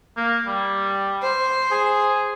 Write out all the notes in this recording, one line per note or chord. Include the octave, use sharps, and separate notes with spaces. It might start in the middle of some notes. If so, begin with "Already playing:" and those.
A#3
G3
C5
G#4